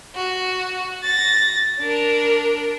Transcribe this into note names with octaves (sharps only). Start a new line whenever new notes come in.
F#4
A6 A#6
D4 A#4